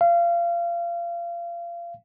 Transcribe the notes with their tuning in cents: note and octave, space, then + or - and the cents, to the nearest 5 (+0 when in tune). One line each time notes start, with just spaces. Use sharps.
F5 -30